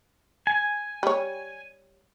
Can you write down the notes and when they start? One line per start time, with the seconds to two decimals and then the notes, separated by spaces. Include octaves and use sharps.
0.47 G#5
1.03 G3 C#5